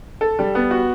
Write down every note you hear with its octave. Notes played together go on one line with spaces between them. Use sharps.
A4
G3
B3
F#4